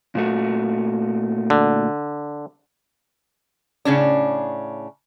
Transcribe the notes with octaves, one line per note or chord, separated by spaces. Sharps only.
A#2 A3 F#4
D3
A2 C#3 C#4 D4